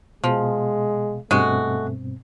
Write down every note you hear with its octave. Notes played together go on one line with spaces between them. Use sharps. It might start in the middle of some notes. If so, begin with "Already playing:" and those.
B2 F3 G#3
G2 B2 G#3 A3 C4 F#4